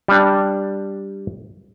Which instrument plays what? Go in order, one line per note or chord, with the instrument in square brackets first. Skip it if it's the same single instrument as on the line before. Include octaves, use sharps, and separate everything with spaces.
[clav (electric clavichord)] G3 D4